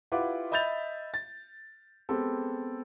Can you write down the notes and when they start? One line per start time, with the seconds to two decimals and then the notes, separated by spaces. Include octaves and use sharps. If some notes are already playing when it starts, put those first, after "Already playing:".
0.12 E4 F4 G4 B4 F#5 D6
0.52 D#5 E5 B5 G6 A6 F7
1.14 A6
2.09 G#3 B3 C4 G4 A4